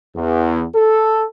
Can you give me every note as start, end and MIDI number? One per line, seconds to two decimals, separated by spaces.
0.16 0.65 40
0.75 1.24 69